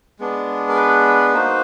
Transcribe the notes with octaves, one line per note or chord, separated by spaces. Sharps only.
G#3 B3 D4
A#4
B4
A#3 D#4 F#4 C5